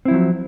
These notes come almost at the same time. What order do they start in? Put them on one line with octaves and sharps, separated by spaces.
C4 E4 F3 F#3